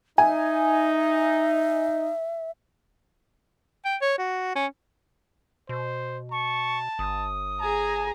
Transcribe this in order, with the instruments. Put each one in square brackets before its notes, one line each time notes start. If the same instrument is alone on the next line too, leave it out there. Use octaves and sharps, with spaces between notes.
[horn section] D#4 [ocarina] E5 [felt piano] G#5
[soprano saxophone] G5
C#5
F#4
C#4
[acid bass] B2 [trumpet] C5
[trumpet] A5 [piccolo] C#6
[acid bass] G1 [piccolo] D#6
[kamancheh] G#4 A#5 [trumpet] G#5